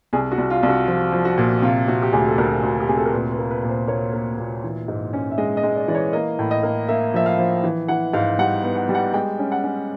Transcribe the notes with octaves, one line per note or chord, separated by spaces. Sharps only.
C2 G#4
F#4
C2
F4
C2
F#4
F3 F4
F3
F#4
A#2
C3 F4
C3 F#4
G4
D2 G#4
A4
D2 A#4
D2
G4
C3 G#4
A4
A#4
A#2 B4
B4
A#3
B4
A#2
C5
A#3 C#5
A#3
A#2
E3
G#2
C#4
E5
G#3 D#5
D#5
G#3
D5
E3 D5
C#5
A#3 D#5
A2
D#5
A#3
A#3 E5
F3 E5
F5
F3
E3
E3 F#5
G#2 F5
G3 F#5
B3
F#5
G3
F#5
G#3 G5
C#4
F#5
C#4